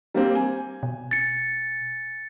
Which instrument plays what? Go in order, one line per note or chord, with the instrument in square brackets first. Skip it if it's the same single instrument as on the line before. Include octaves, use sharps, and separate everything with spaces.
[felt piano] G3 A#3 C4
G#5
[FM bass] B2
[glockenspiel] A6 C#7